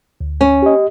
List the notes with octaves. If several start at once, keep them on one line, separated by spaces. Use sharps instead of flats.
D2
C#4
G4 D#5